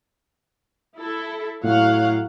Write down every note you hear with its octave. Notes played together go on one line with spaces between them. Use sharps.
E4 A4
A2 F#3 F5 F#5